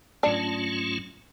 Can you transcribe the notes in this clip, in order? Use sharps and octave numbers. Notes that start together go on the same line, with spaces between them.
G#2 F#3 A3 C#4 D4 F4